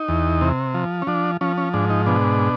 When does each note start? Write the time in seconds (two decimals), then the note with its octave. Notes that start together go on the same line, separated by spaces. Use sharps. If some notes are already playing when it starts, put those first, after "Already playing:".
Already playing: D#4
0.08 E2
0.41 C3
0.74 F3
1.02 C#4
1.07 F3 D4
1.41 F3 C#4
1.58 C#4
1.74 G#2 D4
1.90 D#4
2.06 B2 D4